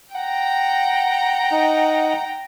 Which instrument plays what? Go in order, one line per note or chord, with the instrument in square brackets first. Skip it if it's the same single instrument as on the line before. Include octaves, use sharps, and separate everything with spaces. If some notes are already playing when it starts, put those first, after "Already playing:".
[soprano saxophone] F#5 [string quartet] G5 A#5
[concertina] D#4